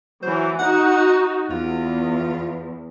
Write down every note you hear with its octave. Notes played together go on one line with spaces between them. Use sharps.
E3 F#3 C5
D#4 F#4 F#5
E2 F4